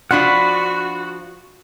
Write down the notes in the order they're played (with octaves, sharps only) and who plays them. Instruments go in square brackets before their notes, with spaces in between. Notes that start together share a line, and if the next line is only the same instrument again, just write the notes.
[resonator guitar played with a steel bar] F3 D4 F4 [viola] F#4 [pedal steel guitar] F#5 B5